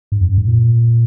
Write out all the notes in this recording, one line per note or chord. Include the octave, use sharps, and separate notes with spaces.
G#2
F2
F#2
G#2
A#2